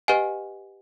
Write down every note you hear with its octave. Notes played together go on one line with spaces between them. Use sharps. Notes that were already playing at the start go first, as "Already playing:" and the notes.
G4 B4 D#5 F#5 G#5